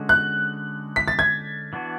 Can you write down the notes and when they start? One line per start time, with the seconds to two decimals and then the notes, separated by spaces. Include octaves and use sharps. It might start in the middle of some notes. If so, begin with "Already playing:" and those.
Already playing: D3 G#3 C#4 F#4
0.09 F#6
0.96 B6
1.08 A6
1.19 G#6
1.73 E3 B3 D4 F#4